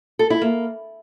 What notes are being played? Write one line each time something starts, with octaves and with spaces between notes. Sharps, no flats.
A4
E4
A#3